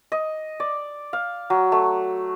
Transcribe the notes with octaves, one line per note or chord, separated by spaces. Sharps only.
D#5
D5
F5
F#3
A3